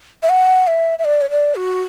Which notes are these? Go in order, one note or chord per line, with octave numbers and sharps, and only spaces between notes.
E5
F#5
E5
E5
D5
C#5
D5
F#4